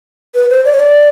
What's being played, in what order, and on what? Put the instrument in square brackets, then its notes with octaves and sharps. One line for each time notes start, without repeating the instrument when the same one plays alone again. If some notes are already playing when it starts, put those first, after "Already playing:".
[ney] B4
C5
D5
C#5
D5